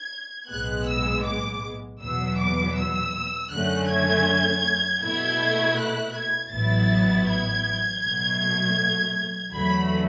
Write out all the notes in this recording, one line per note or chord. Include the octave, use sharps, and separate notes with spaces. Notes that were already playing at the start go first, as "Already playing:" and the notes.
Already playing: G#6
B1 A2 G#3 B3 F#6
E6
D6
E2 B2 F#3 B3 E6
D6
E6
F#2 D3 A3 C#4 F#6
G#6
B2 A3 E4 G#6
F#6
G#6
A1 A2 F#3 B3 E4 A6
G#6
B2 F#3 A3
E2 D3 F#3 A3 B5